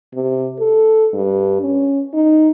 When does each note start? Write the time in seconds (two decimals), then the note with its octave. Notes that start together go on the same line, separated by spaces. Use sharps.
0.14 C3
0.59 A4
1.14 G2
1.62 C#4
2.13 D#4